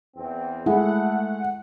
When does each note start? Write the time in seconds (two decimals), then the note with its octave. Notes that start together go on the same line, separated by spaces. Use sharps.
0.16 E2 C4
0.66 G#3 A3 E4 F#5